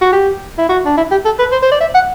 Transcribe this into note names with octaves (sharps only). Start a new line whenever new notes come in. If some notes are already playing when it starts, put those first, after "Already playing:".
F#4
G4
E4
F#4
D4
E4
G4
A4
B4
C5
C5
D5
E5
F#5